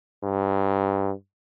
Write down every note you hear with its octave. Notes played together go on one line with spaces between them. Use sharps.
G2